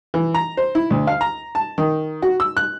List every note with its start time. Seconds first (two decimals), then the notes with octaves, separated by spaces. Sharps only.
0.14 E3
0.34 A#5
0.57 C5
0.75 E4
0.90 D2
1.07 F5
1.21 A#5
1.55 A5
1.78 D#3
2.22 F#4
2.40 E6
2.57 F#6